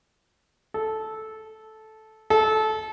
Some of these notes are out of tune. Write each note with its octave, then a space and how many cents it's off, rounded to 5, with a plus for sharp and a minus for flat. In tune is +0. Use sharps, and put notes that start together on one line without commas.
A4 -10
A4 -20